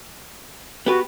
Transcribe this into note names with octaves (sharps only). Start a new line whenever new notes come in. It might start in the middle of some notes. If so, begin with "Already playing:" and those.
B3 F#4 G4 B4